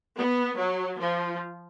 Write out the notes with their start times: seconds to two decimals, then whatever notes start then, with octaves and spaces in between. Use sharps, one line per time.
0.17 B3
0.58 F#3
1.00 F3